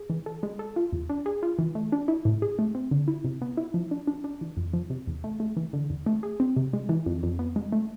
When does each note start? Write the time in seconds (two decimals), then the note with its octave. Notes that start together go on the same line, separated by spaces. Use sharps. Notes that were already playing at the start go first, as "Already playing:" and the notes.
Already playing: G#4
0.10 E3
0.26 A4
0.43 G#3
0.59 A4
0.76 F4
0.93 E2
1.10 D4
1.26 G#4
1.43 F4
1.59 E3
1.75 A3
1.92 D4
2.08 E4
2.25 A2
2.42 G#4
2.59 A3
2.75 C4
2.91 D3
3.08 E4
3.24 C3
3.42 B3
3.57 E4
3.74 F3
3.91 D4
4.07 D4
4.24 D4
4.41 E3
4.57 F2
4.73 F3
4.90 C3
5.07 E2
5.24 A3
5.40 A3
5.57 E3
5.73 D3
5.90 E2
6.06 A3
6.23 G#4
6.40 C4
6.56 C3
6.73 G#3
6.89 E3
7.06 F2
7.23 F2
7.39 B3
7.56 G#3
7.72 A3